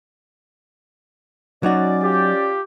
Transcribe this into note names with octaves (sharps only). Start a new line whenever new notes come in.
F#3 C#4 D#4 F#4 D5
F4 G4